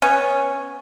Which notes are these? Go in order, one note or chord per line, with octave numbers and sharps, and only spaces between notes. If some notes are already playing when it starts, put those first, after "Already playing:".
B3 C#4 C#5